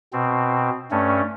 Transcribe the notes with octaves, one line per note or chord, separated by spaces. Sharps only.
B2 C4
G2 A3 C#4